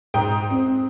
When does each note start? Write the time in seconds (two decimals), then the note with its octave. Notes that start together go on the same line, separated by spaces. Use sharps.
0.14 G#2 G5 D#6
0.50 C4